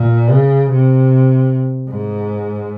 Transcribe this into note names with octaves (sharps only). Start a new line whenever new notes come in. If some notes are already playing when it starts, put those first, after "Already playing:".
Already playing: A#2
C#3
C3
G#2